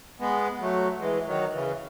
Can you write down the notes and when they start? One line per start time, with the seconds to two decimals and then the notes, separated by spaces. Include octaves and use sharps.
0.20 G#3 B3
0.61 F#3 A3
0.99 E3 G#3
1.26 D#3 F#3
1.53 C#3 E3